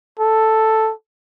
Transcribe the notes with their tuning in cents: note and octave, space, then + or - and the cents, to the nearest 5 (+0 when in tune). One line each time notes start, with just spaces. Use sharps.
A4 +0